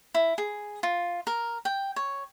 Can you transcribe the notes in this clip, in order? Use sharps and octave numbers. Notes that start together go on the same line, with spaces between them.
E4
G#4
F4
A#4
G5
C#5